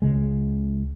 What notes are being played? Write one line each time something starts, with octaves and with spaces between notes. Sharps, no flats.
C#2 C#3 G#3